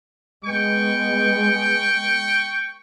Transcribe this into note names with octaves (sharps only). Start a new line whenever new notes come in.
G#3 B3 G5 C#6